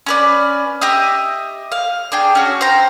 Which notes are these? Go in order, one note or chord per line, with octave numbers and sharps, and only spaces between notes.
C#4 B4 D5
G4 D#5 E5 D#6
F5
D4 G#4 G5
C#4 F#4
C5 G5 A#5